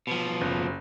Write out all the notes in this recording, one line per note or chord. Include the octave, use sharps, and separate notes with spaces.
B2 F3
F#1